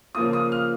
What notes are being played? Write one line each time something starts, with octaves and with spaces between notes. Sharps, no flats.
C#3 F3 A#3 F4 D#6
D#6
F6